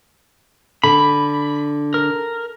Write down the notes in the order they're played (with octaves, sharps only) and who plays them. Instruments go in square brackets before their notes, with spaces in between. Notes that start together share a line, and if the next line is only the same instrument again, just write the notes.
[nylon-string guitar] D3 [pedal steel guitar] B5
[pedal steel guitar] A#4